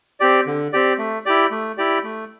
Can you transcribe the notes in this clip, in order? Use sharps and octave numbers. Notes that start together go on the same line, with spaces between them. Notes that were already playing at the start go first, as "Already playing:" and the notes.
C4 G4 D5
D3
C4 G4 D5
A3
E4 G4 D5
A3
E4 G4 D5
A3